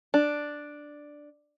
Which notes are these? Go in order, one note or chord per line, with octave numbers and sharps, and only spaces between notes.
D4